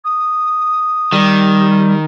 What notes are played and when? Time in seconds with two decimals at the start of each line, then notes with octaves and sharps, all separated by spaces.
0.04 D#6
1.13 D#3 G3